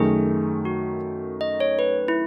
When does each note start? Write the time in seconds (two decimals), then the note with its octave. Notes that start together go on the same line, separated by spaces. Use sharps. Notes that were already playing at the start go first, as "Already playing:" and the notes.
Already playing: F#2 D#3 A3 G#4
0.65 F#4
1.41 D#5
1.60 C#5
1.79 B4
2.08 E4